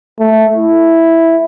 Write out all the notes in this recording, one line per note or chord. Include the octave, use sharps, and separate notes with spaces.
A3
E4